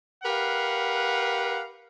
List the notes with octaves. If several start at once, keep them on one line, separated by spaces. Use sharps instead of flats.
G4 A#4 B4 F5 F#5